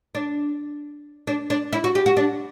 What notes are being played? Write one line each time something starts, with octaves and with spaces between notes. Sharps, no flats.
D4
D4
D4
E4
F#4
G4
F#4
D4